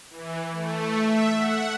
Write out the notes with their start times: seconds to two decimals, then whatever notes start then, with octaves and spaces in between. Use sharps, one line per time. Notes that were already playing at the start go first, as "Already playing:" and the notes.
0.11 E3
0.52 A3
0.98 E5
1.33 F#5